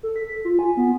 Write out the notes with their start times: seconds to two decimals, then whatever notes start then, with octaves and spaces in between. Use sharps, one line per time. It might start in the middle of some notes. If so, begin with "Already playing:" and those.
0.03 A4
0.16 B6
0.45 F4
0.59 G#5
0.77 B3